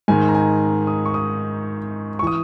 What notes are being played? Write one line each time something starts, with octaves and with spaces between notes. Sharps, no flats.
G#2 D#3 G#5
A#5
G#5
D#6
C#6
D#6
C#6
E3 D#6